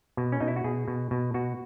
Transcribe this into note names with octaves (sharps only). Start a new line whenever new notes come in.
B2
C#4
B2 D#4
E4
F#4
B2 G#4
B2
B2
B2 F#4